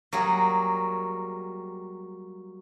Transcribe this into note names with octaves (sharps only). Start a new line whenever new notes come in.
F#3 G3 A#3 G#4